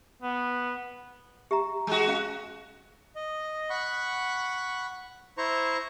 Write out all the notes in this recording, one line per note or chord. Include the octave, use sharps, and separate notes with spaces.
B3
G4 E5 A#5
G#3 F#4
C#4 F5
D#5
F#5 B5 C#6
E4 C5 A#5 C#6